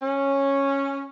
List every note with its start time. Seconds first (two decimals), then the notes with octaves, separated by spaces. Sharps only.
0.02 C#4